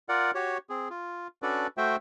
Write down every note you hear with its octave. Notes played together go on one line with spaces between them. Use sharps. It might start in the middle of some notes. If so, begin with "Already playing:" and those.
F4 A#4 D5 F#5
F#4 G4 C#5
C4 G#4
F4
C#4 D4 F#4 A4 B4 D5
A3 F#4 C5 E5 G5